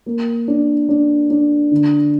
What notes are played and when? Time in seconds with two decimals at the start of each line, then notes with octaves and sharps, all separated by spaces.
0.06 A#3
0.48 D4
0.89 D4
1.31 D4
1.72 D3